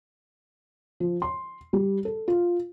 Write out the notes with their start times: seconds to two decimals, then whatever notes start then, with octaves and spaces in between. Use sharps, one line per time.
1.00 F3
1.22 C6
1.73 G3
2.05 A4
2.28 F4